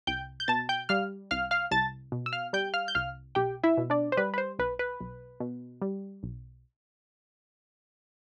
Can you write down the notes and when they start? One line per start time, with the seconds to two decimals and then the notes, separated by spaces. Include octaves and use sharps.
0.07 C2 G5 G6
0.40 G6
0.48 B2 A5 A6
0.69 G5 G6
0.89 G3 F5 F6
1.31 C2 F5 F6
1.51 F5 F6
1.71 C2 A5 A6
2.12 B2
2.26 E6
2.33 F5 F6
2.53 G3 G5 G6
2.74 F5 F6
2.88 G6
2.95 C2 F5 F6
3.35 B1 G4 G5
3.64 E4 E5
3.77 B2
3.90 D4 D5
4.12 C5
4.17 G3 B4
4.34 B4
4.38 C5
4.59 B1 B4
4.79 B4
5.01 B1
5.40 B2
5.82 G3
6.23 B1